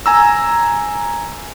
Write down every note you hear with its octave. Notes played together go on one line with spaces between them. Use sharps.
G#5 A#5 E6